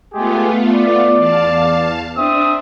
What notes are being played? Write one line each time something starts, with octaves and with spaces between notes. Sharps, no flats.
G#3 A3 B3 F4 G4 G#4
D5
E2 F5 A5
C4 D4 E5 D#6